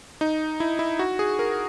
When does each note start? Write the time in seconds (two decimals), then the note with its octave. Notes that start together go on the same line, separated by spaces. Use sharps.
0.21 D#4
0.60 E4
0.79 E4
0.99 F#4
1.19 G#4
1.39 A#4